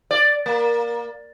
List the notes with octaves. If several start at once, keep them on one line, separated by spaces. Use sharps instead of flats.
D5
A#3